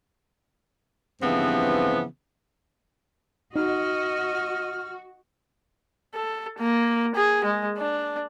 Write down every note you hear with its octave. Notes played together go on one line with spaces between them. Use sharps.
G2 C#3 E3 F3 B3 C4
D#4 F#4 D#5 F6
A4
A#3
G#4
G#3
D4